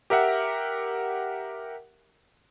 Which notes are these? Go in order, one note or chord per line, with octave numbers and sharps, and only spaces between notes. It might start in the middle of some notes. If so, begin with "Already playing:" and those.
G4 A#4 E5 F#5